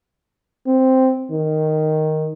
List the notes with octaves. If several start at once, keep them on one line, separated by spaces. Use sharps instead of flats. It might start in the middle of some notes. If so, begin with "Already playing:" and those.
C4
D#3